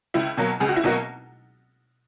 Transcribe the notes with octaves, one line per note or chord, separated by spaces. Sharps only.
C#2 E4
B2 F#3 A#3
C#2 G#4
F#4
E4
B2 F#3 A#3 D#4 F#4